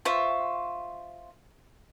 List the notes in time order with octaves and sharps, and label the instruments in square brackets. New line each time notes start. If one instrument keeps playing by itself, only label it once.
[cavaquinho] F4 C5 E5 C#6